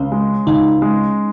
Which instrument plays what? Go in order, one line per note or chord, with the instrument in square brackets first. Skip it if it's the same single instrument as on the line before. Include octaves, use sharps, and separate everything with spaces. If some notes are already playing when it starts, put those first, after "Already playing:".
Already playing: [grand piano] C#2 [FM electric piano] C#4
[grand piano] G#3
[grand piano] C#2 [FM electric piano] D#4
[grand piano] G#3